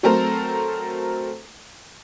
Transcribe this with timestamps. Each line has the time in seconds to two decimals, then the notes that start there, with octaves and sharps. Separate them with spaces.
0.03 F#3 A3 C4 A4 A#4 C5